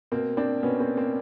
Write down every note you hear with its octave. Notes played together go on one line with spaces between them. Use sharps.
B2 A#3 C4
C4 D4
B2 B3 C#4
A#3 C4
A#3 C4